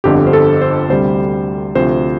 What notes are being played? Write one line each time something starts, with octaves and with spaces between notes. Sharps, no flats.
G1 F2 D3 G4
C5
A4
C5
D2 C3 G3 C5
D2 C3 F3 C5